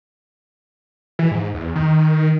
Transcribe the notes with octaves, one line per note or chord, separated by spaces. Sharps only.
E3
G#2
E2
D#3